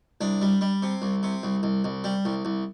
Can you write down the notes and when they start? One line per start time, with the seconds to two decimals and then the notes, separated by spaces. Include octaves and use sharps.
0.21 C2 D4
0.42 G3
0.61 G3
0.82 C3
1.02 C2
1.23 C3
1.43 C2
1.63 C2
1.84 C2
2.04 G3
2.25 C2
2.45 C2